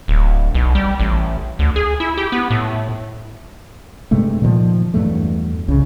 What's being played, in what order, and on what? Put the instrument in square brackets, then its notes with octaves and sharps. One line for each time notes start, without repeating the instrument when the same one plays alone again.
[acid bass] D1
B1
G3
A1
D2
G#4
E4
G4
B3
A2
[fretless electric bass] G2 C3 G#3 A3
A#2 D#3 F3
E2 G2 F#3 A3
C2 C#3